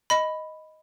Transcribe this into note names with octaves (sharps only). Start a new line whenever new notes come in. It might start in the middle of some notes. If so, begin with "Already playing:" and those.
D#5 B5